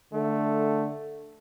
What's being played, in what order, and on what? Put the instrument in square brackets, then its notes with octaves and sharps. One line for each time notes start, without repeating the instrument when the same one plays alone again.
[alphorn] D3 [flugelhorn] A3